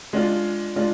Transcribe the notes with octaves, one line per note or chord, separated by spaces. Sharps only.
G#3 D4 F4
G#3 D4 F4